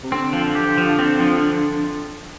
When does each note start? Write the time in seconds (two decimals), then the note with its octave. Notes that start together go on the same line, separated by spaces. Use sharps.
0.03 C3
0.12 D3 C4
0.33 F3
0.55 G4
0.78 F3
0.99 C4
1.20 F3